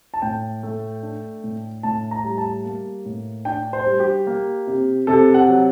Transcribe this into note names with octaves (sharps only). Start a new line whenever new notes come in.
A5
A2 G5
A3
D4
A2
A2 A5
A#5
G3
A5
A#3
A2
D4 G5
C5
G3
G4
A#3
C3
C3 A4
F#5
F#3